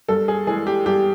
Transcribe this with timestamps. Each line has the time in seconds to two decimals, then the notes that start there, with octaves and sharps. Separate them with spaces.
0.08 G2 A4
0.28 G#4
0.47 E3 G#3 G#4
0.67 G4
0.86 G2 G4